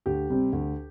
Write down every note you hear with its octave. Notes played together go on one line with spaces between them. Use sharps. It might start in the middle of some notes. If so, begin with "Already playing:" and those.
D2 G4
C3 G3 C4
D2